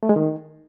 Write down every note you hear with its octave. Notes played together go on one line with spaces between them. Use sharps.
A3
G#3
D#3